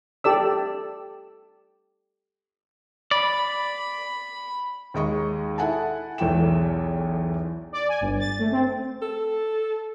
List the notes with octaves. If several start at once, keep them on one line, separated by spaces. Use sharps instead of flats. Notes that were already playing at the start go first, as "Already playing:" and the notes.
G4 A4 D5 E6
D5 B5
D#2 G#3 D#5 C#6
E4 A4 F#5 G#5 A5
B1 E2 E3 A4 G5 E7
D5
G#5
G1
A6
A3
C4
A4